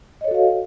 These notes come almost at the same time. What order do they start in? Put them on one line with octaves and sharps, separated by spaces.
D#5 C#5 A4 F#4 F5